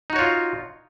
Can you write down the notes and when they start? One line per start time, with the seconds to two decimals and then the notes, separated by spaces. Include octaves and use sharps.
0.10 D#4
0.13 F#4
0.16 C#5
0.19 F4